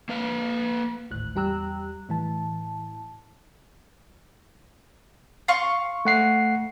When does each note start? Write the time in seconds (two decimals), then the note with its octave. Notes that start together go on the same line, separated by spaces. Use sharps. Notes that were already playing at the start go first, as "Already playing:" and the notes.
0.09 A#3 B4 F5
1.11 G#1 D2 A2 F#6
1.35 E2 G3 G4 A#5 E6 F#6
2.09 A2 E3 A5
5.48 F5 C6 C#6
6.05 A3 F#5 C7